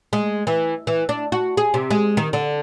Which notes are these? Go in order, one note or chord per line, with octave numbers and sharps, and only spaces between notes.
G#3
E3
E3
D4
F#4
G#4
C3
G#3
D#3
D3